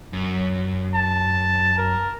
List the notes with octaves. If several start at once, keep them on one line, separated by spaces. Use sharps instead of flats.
F#2
A5
A#4